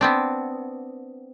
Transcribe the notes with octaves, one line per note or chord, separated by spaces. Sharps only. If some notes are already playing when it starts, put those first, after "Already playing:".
B3 C4 D4